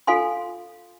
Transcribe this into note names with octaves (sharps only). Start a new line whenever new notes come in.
F4 A4 F5 G#5 C6